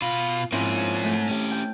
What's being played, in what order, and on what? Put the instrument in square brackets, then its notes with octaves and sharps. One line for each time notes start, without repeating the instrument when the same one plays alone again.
[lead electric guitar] B2 [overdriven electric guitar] F4
[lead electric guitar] G#2 [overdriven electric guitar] F3 A#3 [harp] C4 C#4 E4
[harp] A3 A4
[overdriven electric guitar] C#4 G4
[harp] G5